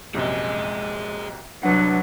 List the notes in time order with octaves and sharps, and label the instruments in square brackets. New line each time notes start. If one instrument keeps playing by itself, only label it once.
[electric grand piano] A#1 F#2 C3 [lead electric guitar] G#4 D#5
[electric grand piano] C2 B4 F#5 [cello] F#3 [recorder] D4